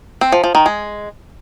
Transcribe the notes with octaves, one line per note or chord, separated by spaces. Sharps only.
C4
F3
F3
D#3
G#3